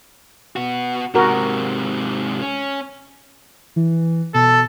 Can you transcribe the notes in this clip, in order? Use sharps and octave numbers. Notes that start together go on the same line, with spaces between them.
B3 F#4
G#2 C3 F#4 A#4
C#4
E3
B2 A4